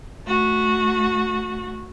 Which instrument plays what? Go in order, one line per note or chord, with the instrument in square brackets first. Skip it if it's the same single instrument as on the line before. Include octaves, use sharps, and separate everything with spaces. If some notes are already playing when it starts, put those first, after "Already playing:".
[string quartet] A3 F#4